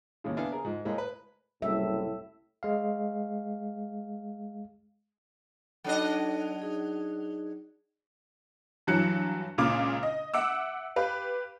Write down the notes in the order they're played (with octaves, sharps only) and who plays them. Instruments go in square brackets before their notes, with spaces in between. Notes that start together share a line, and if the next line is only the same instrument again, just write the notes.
[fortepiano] D#2 A2 C#3
B3 D4 E4 F5 G#5
G#4 A#4
G#2 F3
A2 G#3 A#3
B4
[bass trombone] F#1 [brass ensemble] C2 A2 [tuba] G3 [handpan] E5
[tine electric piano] G#3 F5
[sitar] F#3 D4 D#5 [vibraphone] D#4 A4
[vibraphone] D#4 G#4
[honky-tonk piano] G2 E3 F#3 F#6 C#7
C#2 A#2 C#3 D6 F6
D#5
E5 F#5 D6 E6
G4 B4 F5